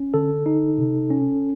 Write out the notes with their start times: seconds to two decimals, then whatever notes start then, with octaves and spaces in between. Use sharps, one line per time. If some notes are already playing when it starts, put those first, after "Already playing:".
Already playing: C#4
0.14 D3 A4
0.46 D#4
0.78 C3
1.11 C#4